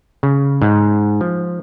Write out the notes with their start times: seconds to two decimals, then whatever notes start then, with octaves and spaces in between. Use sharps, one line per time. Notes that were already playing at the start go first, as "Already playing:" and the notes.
0.23 C#3
0.62 G#2
1.21 F3